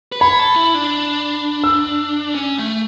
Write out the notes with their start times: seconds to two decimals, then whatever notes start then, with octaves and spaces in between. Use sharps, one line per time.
0.12 B4
0.20 C#5 B5
0.39 A4
0.56 E4
0.75 D4
1.64 E6
2.35 C#4
2.58 A3